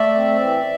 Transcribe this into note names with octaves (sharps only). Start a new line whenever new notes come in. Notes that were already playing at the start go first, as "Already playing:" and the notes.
Already playing: A3 D5 E5
C4
E3